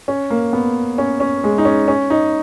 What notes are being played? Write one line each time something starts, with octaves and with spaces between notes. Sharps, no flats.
C#4
A#3
B3
C#4
C#4
G#3
D#4
C#4
C#4
D#4